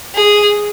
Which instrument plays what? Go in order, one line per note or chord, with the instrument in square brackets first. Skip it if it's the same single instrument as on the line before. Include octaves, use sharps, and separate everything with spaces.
[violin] G#4